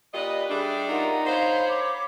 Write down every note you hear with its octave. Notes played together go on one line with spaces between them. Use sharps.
A#2 G4 B4 D5 D#5
G3 A3 D4 G#4
D#4 F4 A#4 F#5
C5 C#5 F5 B5
D6